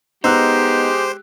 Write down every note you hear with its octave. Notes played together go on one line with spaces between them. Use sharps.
G#3 B3 D#4 G4 C5 E6 F#6